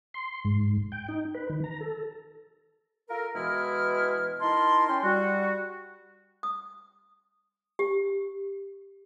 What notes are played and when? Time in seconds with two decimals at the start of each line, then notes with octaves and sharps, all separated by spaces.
0.14 C6
0.45 G#2
0.92 G5
1.08 D#4
1.35 B4
1.50 D#3
1.64 A#5
1.81 A4
3.09 F4 A4 A#4
3.35 B2 E3 G#3 E4 F6
4.41 D#4 E4 A#4 A5 C6
4.88 C#4 E4 G5 C6
5.03 G3 F#4
6.43 D#6
7.79 G4